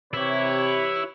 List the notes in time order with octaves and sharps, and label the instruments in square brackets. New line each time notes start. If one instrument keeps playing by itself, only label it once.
[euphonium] C3 [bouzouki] E3 G4 [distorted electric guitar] E4 [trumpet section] B4 C#5